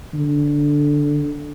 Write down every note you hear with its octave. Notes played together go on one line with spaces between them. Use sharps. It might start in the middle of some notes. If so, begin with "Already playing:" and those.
D3